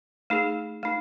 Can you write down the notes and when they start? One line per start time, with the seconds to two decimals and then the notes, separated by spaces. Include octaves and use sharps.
0.30 A3 D#4 G#4
0.83 A3 D#4